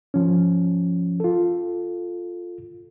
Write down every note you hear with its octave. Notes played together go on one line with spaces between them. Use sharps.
F3 C#4
F4 A4